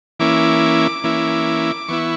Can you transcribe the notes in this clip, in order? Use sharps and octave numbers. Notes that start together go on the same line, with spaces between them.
E3 A#3 C#4 E4 D6
E3 A#3 C#4 E4
E3 B3 E4 C#6